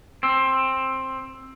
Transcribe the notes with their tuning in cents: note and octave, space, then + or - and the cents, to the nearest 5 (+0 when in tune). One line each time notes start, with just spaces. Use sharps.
C4 +15